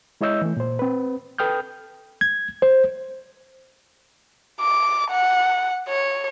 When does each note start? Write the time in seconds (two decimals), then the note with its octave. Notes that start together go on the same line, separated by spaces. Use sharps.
0.21 G#3 E4 C#5 D#5 E6 G6
0.42 E3 A3
0.57 A#2 C5
0.79 C4 B4
1.38 A4 B4 G5 D#6 F6 G6
2.21 G#6
2.62 C5
4.61 D6
5.11 F#5
5.88 C#5